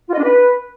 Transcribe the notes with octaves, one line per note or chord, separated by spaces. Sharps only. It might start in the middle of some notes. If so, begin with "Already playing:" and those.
F4
D#5
D4
B4